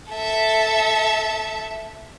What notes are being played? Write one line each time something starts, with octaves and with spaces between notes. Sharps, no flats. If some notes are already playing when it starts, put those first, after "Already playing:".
A4 E5